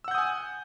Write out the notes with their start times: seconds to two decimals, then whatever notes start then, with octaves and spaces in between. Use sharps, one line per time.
0.04 E6
0.08 F#5
0.11 G6
0.15 D#6
0.18 G#5